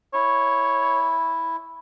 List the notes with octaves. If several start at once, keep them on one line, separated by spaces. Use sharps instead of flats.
E4 C#5